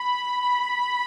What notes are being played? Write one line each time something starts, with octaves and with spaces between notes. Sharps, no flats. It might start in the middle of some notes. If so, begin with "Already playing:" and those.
Already playing: B5